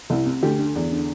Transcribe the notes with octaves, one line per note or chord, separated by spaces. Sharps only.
C2 E4
C3
D2 G4
D3
E2
D3